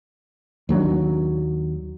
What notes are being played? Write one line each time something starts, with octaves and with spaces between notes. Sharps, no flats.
D#2 F#3 A3 D4